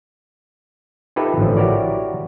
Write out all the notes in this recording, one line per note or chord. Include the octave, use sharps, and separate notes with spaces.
D#4 F4 G4 A4 B4 E5
A1 D3 F3
E4 F#4 G4 A#4 C#5 D5